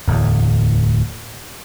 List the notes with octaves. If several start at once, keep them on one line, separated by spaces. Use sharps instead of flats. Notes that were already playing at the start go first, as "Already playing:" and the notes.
D1 E2